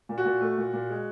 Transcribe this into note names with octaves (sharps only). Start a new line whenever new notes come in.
A#2
F#4
A#2
A3
A#2
A#2
G#3